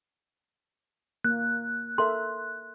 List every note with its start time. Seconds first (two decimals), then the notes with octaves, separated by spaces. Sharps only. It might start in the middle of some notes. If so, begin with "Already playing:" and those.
1.25 A#3 F#6
1.98 A4 A#4 E5 C6